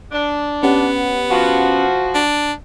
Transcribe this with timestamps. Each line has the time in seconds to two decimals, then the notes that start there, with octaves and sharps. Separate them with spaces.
0.12 D4
0.63 B3 C#4 G4 F#5
1.30 F3 F#4
2.15 D4